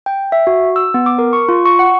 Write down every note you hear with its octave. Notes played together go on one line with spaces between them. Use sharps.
G5
E5
F#4
E6
B3
D6
A#4
C#6
F4
C#6
F#5